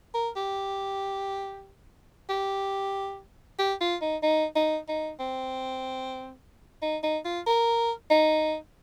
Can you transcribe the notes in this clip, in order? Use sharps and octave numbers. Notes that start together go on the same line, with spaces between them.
A#4
G4
G4
G4
F4
D#4
D#4
D#4
D#4
C4
D#4
D#4
F4
A#4
D#4